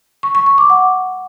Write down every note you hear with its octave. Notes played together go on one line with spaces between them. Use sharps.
C#6
C#6
C#6
D6
F#5